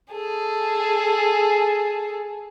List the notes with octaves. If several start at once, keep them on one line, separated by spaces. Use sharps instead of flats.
G#4 A4